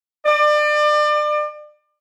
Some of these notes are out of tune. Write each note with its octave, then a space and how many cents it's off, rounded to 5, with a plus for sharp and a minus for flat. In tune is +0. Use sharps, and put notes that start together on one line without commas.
D5 +30